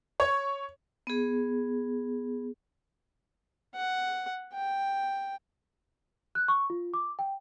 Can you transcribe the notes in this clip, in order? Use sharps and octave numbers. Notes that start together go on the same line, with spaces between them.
C#5
B3 G#4
F#5
G5
F#6
C#6
F4
D6
G5